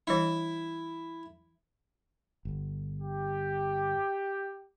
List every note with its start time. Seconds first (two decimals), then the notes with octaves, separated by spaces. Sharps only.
0.07 E3 G3 D4 E4
2.45 G1
3.01 G4